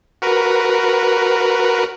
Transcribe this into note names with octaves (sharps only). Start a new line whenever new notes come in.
F#4 A#4 B4